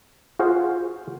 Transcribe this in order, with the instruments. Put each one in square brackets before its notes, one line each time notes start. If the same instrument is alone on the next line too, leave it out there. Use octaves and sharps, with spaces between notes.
[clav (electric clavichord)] F4 F#4 G#4 C5 F5